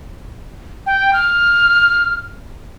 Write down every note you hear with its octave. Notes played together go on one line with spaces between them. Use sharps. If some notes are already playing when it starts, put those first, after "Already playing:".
G5
F6